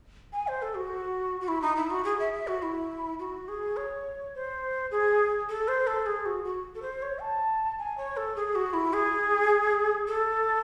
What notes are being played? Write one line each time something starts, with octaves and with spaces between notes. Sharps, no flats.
G#5
C5
A4
F#4
F#4
E4
D#4
E4
F#4
G#4
E5
E5
F#4
E4
F#4
G#4
C#5
C5
G#4
A4
C5
A4
G#4
F#4
F#4
A4
C5
C#5
A5
G#5
C#5
A4
G#4
F#4
E4
G#4
A4